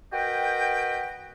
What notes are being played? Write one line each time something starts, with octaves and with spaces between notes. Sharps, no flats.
F#4 A#4 B4 D#5 G5